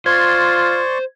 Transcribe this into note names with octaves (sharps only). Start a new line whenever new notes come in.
F4 C5 D5 C6 C#6 G#6